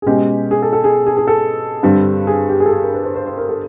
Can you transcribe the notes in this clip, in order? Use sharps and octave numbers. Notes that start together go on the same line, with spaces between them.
G#4
B2 G#3 C#4 G4
G#4
A4
A4
G#4
G#4
G#4
A4
G2 D3 G3 C4
G#4
G4
G#4
A4
G#4
A#4
B4
C5
C5
C5
A#4
A4